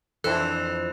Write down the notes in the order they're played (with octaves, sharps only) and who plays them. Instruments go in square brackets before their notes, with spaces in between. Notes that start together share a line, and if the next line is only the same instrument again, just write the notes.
[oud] F2 D4 [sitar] E3 C4 E4 [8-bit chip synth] A4 [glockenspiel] F#6 E7